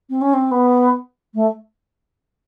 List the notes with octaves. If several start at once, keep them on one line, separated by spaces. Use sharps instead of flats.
C4
C#4
C4
B3
A3